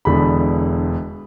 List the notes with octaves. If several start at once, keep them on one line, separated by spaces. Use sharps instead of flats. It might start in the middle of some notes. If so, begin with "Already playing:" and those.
E1 E2 D3 B5